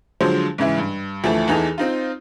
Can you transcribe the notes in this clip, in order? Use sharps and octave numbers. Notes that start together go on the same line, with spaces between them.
D3 F3 F#3 G#3 C5
G#2 C#3 E3 E4
G2
D2 E3 F3 A3 A4 A5
E2 E3 D#4 G#4 A4 F7
C4 D#4 F4